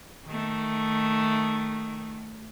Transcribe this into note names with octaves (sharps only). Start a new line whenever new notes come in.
D#3 A3